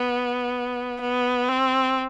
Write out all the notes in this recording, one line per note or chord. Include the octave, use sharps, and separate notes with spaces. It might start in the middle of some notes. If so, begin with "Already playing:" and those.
Already playing: B3
B3
C4